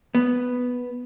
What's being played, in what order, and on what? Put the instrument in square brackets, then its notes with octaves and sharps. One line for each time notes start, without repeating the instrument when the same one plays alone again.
[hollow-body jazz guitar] B3